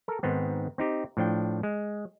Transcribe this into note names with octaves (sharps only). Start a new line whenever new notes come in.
A4 A#4
G#2 D#3 B3 C4
C4 D#4 G4
A2 F3 D4 G5
G#3